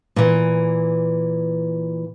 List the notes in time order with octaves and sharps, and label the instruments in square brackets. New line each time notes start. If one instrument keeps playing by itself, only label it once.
[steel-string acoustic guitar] A#2 E3